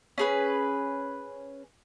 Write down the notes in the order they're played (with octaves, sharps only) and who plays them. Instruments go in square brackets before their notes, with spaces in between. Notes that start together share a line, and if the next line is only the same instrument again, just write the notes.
[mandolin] C#4 G#4 B4